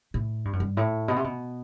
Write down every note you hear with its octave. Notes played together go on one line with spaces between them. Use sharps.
A2
G2
F#2
G2
A2
B2
C3
B2